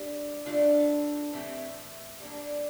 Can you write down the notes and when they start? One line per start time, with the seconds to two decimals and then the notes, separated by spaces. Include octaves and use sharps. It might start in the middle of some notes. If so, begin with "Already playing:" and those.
Already playing: G3 D4 G4
0.45 D3 A3 D4 F4 A4
1.33 A2 E3 A3 C4 G4
2.20 G3 A#3 D4